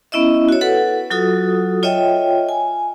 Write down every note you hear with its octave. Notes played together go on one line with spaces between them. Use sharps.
B3 C#4 E4 D#5 E5
F#4 C#5
A4 B4 F#5
F#3 F4 F#4 A4 D#6
F4 C#5 D#5 E5 G5
G#5